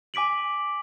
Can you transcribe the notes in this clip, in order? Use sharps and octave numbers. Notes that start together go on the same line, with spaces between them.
G#5 D6 B6 D7 F#7